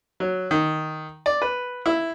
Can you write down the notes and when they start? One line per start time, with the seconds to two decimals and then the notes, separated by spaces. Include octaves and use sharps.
0.20 F#3
0.51 D#3
1.26 D5
1.42 B4
1.86 E4